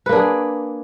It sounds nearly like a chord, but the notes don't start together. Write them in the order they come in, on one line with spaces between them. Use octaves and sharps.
B4 A#3 D4 G#4